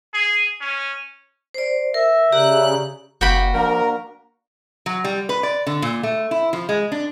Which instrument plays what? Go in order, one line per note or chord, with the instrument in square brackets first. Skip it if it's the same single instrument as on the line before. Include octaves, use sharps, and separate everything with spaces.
[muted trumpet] G#4
C#4
[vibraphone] C5 D5
[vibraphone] A#4 [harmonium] E5
[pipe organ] C#3 F#6 [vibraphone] G4 D5 A#5
[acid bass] F#1 [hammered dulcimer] A#3 [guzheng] F#4 G5 B5
[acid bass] F3 [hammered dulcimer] A#3 D4 [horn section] A#4
[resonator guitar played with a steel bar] F#3
G3
B4
D5
D3
A#2
A3
E4
F3
G#3
D4